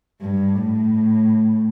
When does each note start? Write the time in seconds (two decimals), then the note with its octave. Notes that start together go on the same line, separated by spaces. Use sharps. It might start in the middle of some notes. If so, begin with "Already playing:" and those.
0.21 G2
0.55 A2